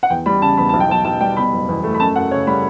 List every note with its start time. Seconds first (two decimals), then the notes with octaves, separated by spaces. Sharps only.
0.03 F#5
0.10 E2 G5
0.26 G3 B5
0.42 C#3 A5
0.57 E2 B5
0.69 B1 A5
0.80 G5
0.90 B1 A5
1.04 B1 A5
1.21 G3 G5
1.37 B2 B5
1.52 F#1
1.69 E2
1.84 A3
1.94 B5
2.00 F#2 A5
2.16 F#2 F#5
2.31 C#3 C#5
2.47 G3 B5